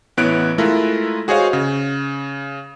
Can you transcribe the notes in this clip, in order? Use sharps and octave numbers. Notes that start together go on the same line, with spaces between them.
A1 B3 E4 C#5 F#6 D7
G#3 A3 E4 F4 A4 A#4
F#4 G#4 C5 C#5 D#5 F5
C#3